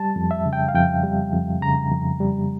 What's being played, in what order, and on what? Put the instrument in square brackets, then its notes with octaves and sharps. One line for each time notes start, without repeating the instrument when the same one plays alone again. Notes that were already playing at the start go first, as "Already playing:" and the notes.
Already playing: [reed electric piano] G3 A5
F2
E5
C#3
G5
F5
F2 G5
G3
F2
C#3 A#5
F2
G3